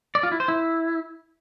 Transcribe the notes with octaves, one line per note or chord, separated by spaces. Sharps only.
D5
F4
E4
C5
E4